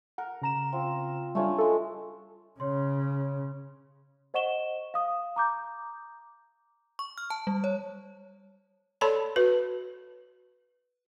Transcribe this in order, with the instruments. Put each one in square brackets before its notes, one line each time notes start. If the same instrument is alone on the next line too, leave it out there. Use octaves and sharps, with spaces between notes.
[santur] A#4 [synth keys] F#5
[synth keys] C#3 A#5 E7
[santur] C4 F4
[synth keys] G3 D4 [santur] A3 C#4 F4
[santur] G#3 F#4 [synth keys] F4 A4
[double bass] C#3 [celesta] C#5 C6
[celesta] C5 D#5 F#5 C#6 E7 G7
F5 D#6
A#5 D6 G6
[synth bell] C#6
F6
A5
G3
C#5
[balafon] A4 C#5 D5 A5 B5 C6
F#4 B4